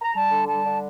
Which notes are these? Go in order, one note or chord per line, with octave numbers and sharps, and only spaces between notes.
A#5
G3 A5
D3
G3 A5
D3